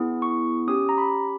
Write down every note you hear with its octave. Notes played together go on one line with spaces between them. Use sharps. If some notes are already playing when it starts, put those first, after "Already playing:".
Already playing: B3 E4 G#4
C#6
C#4 G4 D#6
A#5
B5